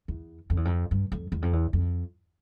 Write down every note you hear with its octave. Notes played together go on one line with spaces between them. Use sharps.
E2
F2
E2
F2
G2
F2
E2
F2
E2
F2